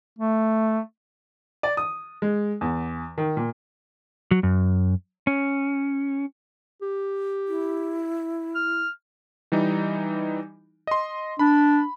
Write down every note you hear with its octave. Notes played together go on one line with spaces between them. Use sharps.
A3
D5
D#6
G#3
E2
D#3
A#2
F#3
F#2
C#4
G4
E4
F6
E3 G3 D#4
D#5 C6
D4 B5